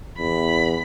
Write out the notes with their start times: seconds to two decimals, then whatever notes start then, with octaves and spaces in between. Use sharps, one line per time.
0.18 E2 B5